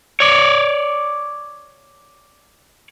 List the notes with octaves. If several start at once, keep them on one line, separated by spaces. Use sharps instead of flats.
C#5 D5